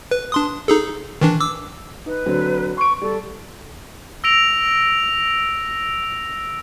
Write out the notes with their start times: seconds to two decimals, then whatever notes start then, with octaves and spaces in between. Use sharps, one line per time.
0.11 B4
0.32 D4 C6 D#6
0.68 D#4 G#4 A4
1.21 D#3 E3 D4
1.40 D6 E6
2.06 D#4 B4
2.26 D3 F#3 C4
2.77 C6 C#6 D7
3.02 G3 A4
4.24 E6 A#6 D7 F7